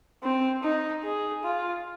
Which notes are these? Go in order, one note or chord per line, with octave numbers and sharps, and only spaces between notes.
C4
D#4
G#4
F4